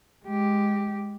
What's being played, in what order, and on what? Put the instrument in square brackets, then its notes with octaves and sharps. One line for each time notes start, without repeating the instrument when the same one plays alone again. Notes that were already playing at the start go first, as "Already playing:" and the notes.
[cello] G#3 G4